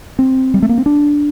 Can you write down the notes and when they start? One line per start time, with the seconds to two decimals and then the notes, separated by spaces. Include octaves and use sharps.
0.19 C4
0.54 G3
0.62 A3
0.69 A#3
0.78 C4
0.86 D4